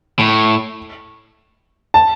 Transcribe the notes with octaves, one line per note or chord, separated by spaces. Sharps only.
A2
A5